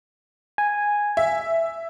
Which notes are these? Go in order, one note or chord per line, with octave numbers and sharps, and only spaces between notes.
G#5
E5